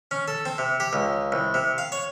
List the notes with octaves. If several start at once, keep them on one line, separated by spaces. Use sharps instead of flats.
C#4
A4
C4
C3
G4
C#2
C2
C3
F5
C#5